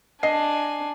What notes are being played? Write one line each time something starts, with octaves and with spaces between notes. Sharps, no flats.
D4 D#5 G#5 C7